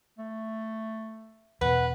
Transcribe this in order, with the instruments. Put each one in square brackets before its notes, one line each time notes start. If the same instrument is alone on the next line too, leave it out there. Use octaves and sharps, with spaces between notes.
[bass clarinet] A3
[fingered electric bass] E2 B2 [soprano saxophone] B4 [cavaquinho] F#5